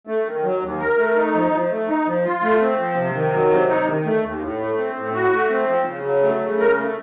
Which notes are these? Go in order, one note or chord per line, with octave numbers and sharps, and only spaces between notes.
A3
D#3
F#3
D#2
A#4
A3
D#4
F3
F3
A3
D#4
F3
F4
A3
C4
F3
C3
D#3
F#3
C3
D#4
D#3
A3
D#2
A2
A3
C4
A2
F#4
A3
C4
F3
C#3
F#3
A3
C#3
A#4
A3